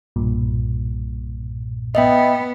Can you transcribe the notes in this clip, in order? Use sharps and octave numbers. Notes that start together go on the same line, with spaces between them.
B1 G2 A#2
B3 D#5 E5 G5